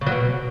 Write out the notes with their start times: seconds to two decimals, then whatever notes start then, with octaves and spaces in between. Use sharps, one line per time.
0.01 C#3
0.06 F#3
0.12 B2